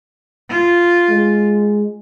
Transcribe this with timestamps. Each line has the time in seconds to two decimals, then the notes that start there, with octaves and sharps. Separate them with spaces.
0.50 F4
1.11 G#3